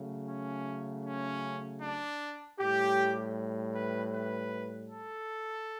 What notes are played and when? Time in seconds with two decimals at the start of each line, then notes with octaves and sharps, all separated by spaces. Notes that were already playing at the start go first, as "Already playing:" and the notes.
Already playing: C#3 F#3 A3
0.29 C#4
1.05 C#4
1.82 D4
2.59 A2 G3 G4
3.74 B4
4.13 B4
4.90 A4